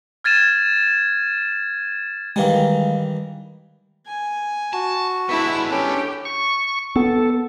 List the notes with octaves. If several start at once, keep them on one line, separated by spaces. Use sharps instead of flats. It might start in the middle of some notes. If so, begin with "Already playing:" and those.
F6 G#6 A6 D#7 E7
D#3 E3 G3 G#3 F5
G#5
F#4 A5
G#3 B3 D4 E4 E5
C#4 G4 A4
C#6
B3 A4